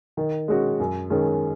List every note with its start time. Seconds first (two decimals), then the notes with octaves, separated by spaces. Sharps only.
0.17 D#3
0.48 G#3 C#4 F#4
0.80 F#2
1.10 D#3 G#3 C#4